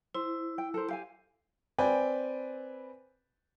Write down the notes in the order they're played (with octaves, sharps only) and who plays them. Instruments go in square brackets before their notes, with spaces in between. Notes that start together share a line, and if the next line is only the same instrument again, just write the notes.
[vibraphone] E4 [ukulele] C5
[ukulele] G5
A4 A#4 C5
G4 F5 G#5
[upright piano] C4 B4 D5 G5 G#5